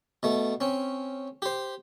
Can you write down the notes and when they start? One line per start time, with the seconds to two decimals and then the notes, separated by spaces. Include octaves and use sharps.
0.23 B2 A3
0.61 C4 C#4
1.42 G4 C5